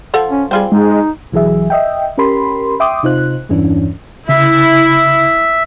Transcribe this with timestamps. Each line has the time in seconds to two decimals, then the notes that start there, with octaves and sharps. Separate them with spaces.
0.14 F3 A4 F#5
0.30 C#4
0.51 G3 C4 F4 G#4
0.72 G#3 D#4
1.32 B1 E3 F#3 G#4 E5
1.70 D#5 E5 G5
2.18 C#4 G4 A#4 B5 C6
2.80 E5 G5 C6 D6 D#6
3.03 C3 D#4 F4 C5 F#6
3.49 E2 G2 E3 C#4 D4
4.29 C#3 E4 E5